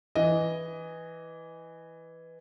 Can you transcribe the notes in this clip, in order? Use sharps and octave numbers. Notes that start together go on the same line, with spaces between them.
E3 D#5